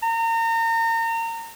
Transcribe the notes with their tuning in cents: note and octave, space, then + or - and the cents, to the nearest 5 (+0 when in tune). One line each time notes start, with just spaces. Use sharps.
A#5 -35